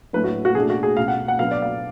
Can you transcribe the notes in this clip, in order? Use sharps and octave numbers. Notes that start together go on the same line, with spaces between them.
A2 F#3 A3 D4 B4
F#4
F#4
B2 A3 D4 G#4
F#4
G#4
C#2 B2 A3 F5
F#5
F#5
B2 F#3 B3 D4 F5
D5
F5